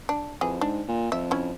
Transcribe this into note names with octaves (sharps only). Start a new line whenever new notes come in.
D4
F2 E3 G#4
G#2 D4
A#2
F2 E5
C#4 E4